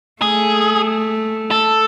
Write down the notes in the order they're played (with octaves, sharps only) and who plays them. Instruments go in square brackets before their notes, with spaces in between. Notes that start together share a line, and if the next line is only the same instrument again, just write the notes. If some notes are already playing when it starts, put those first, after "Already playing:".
[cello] A3 [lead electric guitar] G#4
[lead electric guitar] A4